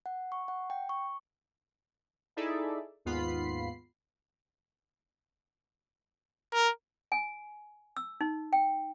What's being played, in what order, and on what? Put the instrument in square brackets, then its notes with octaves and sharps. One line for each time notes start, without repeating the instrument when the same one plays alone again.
[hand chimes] F#5
C#6
F#5
G5
C#6
[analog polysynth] D#4 E4 G#4 A4 D5 E5
D#2 G#2 B3 F4 B5 C7
[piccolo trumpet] A#4
[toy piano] G#5
E6
D#4
G5